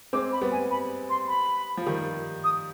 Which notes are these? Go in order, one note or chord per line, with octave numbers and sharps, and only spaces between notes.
G#3 C4 D6
B5
G3 B3
G#5
B5
C6
B5
F3
D#3 G3
D#6